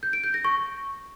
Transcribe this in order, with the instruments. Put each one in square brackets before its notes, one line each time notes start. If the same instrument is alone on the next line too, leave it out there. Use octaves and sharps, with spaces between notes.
[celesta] G6
D7
G6
A#6
C#6